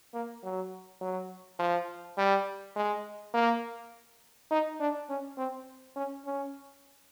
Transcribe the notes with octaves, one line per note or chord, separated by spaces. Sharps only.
A#3
F#3
F#3
F3
G3
G#3
A#3
D#4
D4
C#4
C4
C#4
C#4